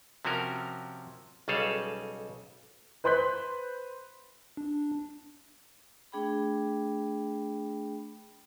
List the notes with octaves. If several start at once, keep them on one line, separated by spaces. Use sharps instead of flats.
C3 F3 C#4 F#4 A#4
B1 C#3 G3 G#4 A4 F5
B4 C5 C6 F#6 G6 B6
D4
A3 D4 G#4 G5 B5